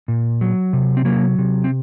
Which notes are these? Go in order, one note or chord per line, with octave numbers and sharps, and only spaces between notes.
A#2
F#3
C3
C4
F#3 A#3
C3
C4